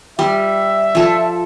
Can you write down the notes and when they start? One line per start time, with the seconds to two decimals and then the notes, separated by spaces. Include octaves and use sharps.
0.19 G3 E5
0.95 F3 A4